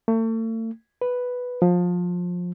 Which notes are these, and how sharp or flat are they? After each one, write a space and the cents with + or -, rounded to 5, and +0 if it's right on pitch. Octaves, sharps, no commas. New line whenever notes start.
A3 +40
B4 +0
F3 +25